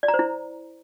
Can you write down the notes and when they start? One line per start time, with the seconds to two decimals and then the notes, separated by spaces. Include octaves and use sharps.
0.03 D5
0.08 A#5
0.14 C5
0.19 E4